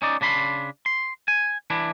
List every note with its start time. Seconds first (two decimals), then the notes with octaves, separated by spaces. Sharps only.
0.02 C#4 D#4 D5
0.21 C#3 D4 B5 C6
0.86 C6
1.28 G#5
1.70 E3 D4 E4